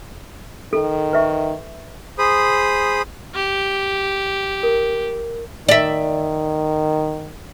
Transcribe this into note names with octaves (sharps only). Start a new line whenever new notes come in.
D#3 A4
B4 E5 C#6
G#4 C5 B5 D#6
G4
A#4
D#3 D5 E5